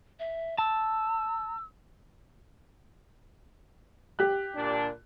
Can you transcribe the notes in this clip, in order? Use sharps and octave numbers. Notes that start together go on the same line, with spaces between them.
E5
A5 E6
G4 F#6
A#2 D3 D4